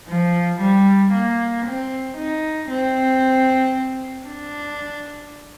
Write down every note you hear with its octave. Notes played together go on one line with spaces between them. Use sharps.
F3
G3
A#3
C4
D#4
C4
D4